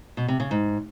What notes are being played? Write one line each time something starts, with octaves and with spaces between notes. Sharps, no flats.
B2
C3
C#3
G#2